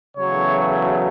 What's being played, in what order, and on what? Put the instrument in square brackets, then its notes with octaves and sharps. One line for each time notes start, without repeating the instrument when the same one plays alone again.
[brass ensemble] E2 C#3 F#3 A3 C#5